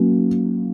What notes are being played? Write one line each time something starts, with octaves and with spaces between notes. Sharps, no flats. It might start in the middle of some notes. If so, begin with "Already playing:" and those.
Already playing: F#3 A#3 C#4